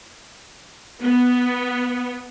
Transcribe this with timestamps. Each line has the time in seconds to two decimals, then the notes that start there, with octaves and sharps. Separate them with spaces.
1.02 B3